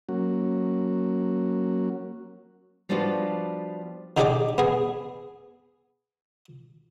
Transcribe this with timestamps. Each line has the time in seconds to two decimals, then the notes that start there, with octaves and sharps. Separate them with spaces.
0.09 F#3 A#3 C#4 F#4
2.89 F3 G3 B3 D4 F4 F#4
4.17 D3 D#4 G4 G#4 D5 D6
4.58 B3 G#4